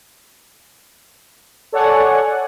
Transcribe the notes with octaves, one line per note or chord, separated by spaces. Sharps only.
A4 C#5 D5 F#5 G#5